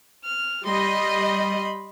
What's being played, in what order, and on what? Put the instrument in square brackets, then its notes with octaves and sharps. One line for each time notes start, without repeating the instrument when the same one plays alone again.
[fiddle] F6
[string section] G3 D#5 [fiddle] B5 C6